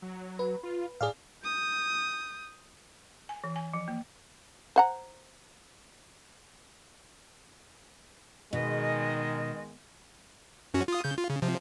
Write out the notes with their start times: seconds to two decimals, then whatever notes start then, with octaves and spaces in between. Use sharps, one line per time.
0.02 F#3
0.39 B4
0.63 F4
1.01 A2 G#4 D5 F5
1.44 D#6 G6
3.29 G#5
3.44 E3
3.56 G#5
3.73 F3
3.88 A#3
4.76 C5 F#5 A#5
8.53 B2 D#3 G#3 D#5
10.74 F#2 C#4 F#4
10.88 F4 D#6
11.04 C#3 G6
11.18 F4
11.30 C#3
11.42 C3 F3